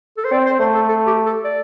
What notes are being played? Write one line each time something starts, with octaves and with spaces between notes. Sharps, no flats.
A4
C5
C4 D5
C5
A3 C5
A4
A4
G4
A4
D5